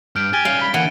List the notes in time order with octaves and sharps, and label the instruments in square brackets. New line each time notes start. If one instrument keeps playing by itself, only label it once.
[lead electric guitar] G2 [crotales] F6 G6 D7
[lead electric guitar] G4 [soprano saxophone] G#5 [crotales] A6 D7 G7
[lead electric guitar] G3 C#4 [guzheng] F5 [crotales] D7
[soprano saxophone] B5
[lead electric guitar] D3 A#3 [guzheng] E3 [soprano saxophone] F#5 [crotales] D#7